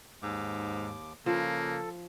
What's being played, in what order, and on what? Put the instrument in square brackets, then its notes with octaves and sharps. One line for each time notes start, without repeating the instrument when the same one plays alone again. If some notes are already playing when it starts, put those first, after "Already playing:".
[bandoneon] D#2 D6 [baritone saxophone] G#2
[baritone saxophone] C#3 [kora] F3 [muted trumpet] A#3 [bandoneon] A4